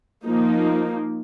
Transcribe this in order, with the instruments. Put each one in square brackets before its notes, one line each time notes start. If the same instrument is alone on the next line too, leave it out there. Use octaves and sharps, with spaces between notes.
[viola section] F3 A#3 D#4